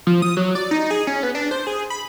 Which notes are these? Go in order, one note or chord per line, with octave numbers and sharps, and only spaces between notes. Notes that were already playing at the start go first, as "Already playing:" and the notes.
F3
D#6
F#3
D5
D#4
G#4
C#4
B3
D4
C5
G#4
B5